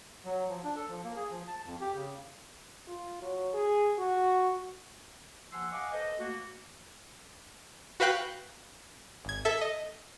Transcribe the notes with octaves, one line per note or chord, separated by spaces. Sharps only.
F#3
F3
D4
A4
F3
A#3
G#4
F3
A5
F2
G4
C#3
F4
F#3
G#4
F#4
D#2 F3 F#5 G#5 C6 E6
D#5 F5 F#5 G#5 C#6 D6
A4 B4 C5 D#5
A3 A#3 F#4
F#4 B4 F5 G5 F#6
G#1 G#6
A4 E5
D#5